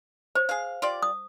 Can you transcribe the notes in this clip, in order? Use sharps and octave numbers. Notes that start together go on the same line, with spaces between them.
C5 C#5
G#4 F5
F4 G4 D5
D#6